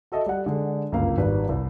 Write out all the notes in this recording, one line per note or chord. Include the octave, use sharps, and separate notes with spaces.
F#4 A4 D#5 E5
G3 F#5
D3 G#3
G1 C#2 F#2 A#3 F5
G#1 G3 B4
C2